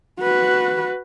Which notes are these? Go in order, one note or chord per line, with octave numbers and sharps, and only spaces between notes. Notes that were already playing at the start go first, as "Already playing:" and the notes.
F#4 B4